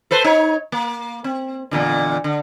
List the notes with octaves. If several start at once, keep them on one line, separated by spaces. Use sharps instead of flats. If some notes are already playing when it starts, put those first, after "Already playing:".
A4 B4 C5
D#4 C#5
A#3
C4
E2 A#2 D3
D3